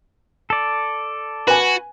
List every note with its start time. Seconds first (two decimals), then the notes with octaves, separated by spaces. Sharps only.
0.50 A4 D5
1.47 F#4 B4 G#5